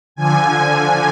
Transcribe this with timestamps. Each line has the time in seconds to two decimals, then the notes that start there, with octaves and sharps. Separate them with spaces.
0.15 D3 F3 G#5
0.57 G#5